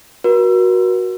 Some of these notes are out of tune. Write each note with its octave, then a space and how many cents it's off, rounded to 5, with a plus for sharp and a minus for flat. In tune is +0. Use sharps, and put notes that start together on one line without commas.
F#4 +0 A#4 +40